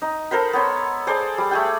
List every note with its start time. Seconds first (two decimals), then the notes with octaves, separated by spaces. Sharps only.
0.02 D#4
0.31 A4 A#4 C5 B5
0.53 B3 C#5 C6
1.07 G#4 A4 C5 D5
1.38 G3
1.51 A3 G#4 G5